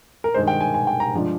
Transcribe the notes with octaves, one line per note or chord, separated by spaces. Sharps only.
A#4
G2 D#3 G#3 C5
G5
G#5
G#5
G5
A#5
G2 F3 G#3 D4